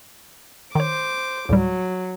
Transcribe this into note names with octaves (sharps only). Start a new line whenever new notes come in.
D#3 C5 C#5 D6
D2 A2 F#3 G3